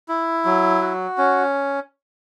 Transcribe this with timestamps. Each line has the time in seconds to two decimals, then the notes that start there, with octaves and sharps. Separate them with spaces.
0.08 E4
0.45 F#3
0.81 F#4
1.18 C#4